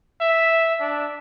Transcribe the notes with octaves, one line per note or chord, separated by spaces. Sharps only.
E5
D4